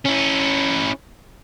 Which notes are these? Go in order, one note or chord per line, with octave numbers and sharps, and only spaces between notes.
C#4 E4